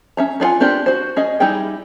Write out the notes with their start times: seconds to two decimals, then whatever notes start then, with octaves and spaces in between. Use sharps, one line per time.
0.17 C#4 E5 A#5
0.40 B3 D4 F4 F#5 G#5
0.60 B3 C4 D4 G4 A#4
0.86 F#4 C5
1.16 C#4 G#4 D#5
1.40 G3 D#4 E4 G#4 G5